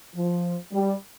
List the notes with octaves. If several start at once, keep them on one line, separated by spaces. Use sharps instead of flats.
F3
G3